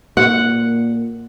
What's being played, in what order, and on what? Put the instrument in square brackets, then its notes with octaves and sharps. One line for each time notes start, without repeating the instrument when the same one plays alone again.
[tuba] A#2 [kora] F#5